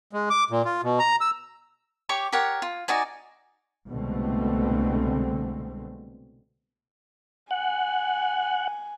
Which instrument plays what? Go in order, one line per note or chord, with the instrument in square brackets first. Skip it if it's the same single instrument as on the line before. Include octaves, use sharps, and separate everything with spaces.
[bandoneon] G#3
D6
A#2
F4
B2
A#5
E6
[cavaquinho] G4 C#5 C#6 D6
G4 A#4 C#5 F#5
F4
D#4 F#4 D5 G#5
[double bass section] C2 B2 D3 G#3 A3 C4
[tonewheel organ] F#5 [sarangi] G#5